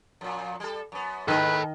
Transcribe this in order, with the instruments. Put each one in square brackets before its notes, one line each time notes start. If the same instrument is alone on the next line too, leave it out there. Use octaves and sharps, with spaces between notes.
[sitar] F2 A#2
G3 A4
F#2 B3
[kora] D#3 D#5 [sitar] G#3 D#4 E4 [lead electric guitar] A4 B5 [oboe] B4